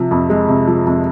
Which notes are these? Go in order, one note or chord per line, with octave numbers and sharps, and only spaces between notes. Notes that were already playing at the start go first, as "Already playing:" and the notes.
Already playing: C3 F3
F2
G#3
C3
F3
F2